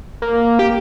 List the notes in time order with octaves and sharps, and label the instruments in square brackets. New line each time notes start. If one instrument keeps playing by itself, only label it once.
[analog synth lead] A#3
G4